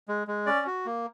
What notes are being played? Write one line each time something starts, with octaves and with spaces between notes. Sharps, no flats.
G#3
G#3
C#4 D5
F#4
A#3